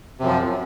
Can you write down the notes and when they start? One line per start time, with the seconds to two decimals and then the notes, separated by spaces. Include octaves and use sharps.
0.20 C3
0.23 F#2
0.26 F3